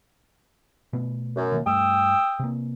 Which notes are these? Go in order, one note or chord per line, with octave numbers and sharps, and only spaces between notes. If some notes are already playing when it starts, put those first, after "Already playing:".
B2 A3 B3
F#2
B2 D#3 A#3
G2 A3 G5 D#6 E6
C3 A#3